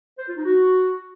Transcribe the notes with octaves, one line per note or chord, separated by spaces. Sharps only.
C5
F4
D#4
F#4